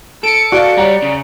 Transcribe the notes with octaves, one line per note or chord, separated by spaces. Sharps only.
A4 C#7 D7
F#4 D5 F5
G3 C#5 F#5 A#5
C#3